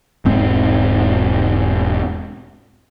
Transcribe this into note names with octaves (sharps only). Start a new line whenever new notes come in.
E1 G#2 C4